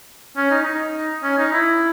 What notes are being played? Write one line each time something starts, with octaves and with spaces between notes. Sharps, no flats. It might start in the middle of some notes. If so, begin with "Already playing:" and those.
C#4
D#4
D#4
C#4
D#4
E4